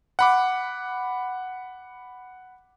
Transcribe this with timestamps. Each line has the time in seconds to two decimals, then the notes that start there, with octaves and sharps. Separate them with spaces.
0.19 F#5 B5 D6